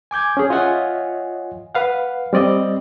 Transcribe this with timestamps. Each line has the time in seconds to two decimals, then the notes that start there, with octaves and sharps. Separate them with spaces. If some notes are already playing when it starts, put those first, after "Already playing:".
0.11 G#5 D6 G6 G#6
0.37 C#4 G#4
0.50 F4 C#5 D#5 E5 F#5 G#5
1.75 B4 F5 F#5
2.33 G3 C4 D5 D#5